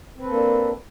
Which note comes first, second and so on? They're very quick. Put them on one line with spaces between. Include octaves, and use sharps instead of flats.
C4 B4 A4 A#3 D4